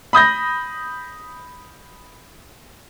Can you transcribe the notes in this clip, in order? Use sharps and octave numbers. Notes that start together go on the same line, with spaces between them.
B5 D#6 G6 A#6